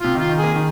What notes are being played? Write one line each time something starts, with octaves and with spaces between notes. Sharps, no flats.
C3 F4
D#3 F4
D#3
A#3 G#4
D#3